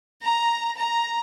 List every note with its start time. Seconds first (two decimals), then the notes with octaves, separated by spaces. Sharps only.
0.23 A#5
0.77 A#5